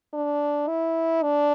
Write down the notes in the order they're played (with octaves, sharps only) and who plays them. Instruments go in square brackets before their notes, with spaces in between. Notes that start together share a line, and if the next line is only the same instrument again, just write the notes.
[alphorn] D4
E4
D4